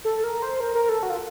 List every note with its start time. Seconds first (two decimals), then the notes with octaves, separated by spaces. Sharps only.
0.05 A4
0.24 A#4
0.42 C5
0.60 A#4
0.75 A#4
0.89 A4
1.03 F#4
1.10 F4